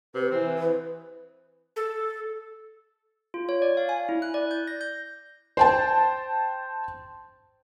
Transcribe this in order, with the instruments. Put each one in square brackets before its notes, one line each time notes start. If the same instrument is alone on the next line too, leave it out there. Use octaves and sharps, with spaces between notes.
[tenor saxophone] C3 [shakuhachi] B4
[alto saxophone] E3 [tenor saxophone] C4
[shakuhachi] B4
[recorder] A4
[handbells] F4
C#5
D5
F5
G#5
E4
F#6
D5
G6
A#6
G6
[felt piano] C5 G5 A5